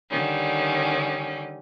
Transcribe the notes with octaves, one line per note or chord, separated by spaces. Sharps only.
D3 D#3 G3 C#4